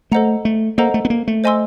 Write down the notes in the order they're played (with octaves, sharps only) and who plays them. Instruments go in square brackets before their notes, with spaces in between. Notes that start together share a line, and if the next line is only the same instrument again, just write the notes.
[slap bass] A3 [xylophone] A4 C5 D#5 F#5 A#5
[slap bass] A3
[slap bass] A#3 [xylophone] A4 C5 D#5 F#5 A#5
[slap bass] A3
B3
A#3
A3
[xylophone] C5 D#5 G#5 C6 E6